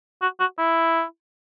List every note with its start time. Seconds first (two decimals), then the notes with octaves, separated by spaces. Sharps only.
0.22 F#4
0.40 F#4
0.58 E4